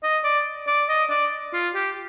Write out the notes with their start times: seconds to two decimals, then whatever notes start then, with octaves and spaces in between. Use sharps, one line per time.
0.03 D#5
0.24 D5
0.68 D5
0.89 D#5
1.10 D5
1.53 F4
1.75 G4